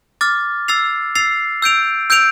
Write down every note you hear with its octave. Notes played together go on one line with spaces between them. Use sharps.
D6 F6 A6
E6 A6 C7 F7
E6 A6 C7 F7
E6 G6 D7 F7
E6 G6 D7 F7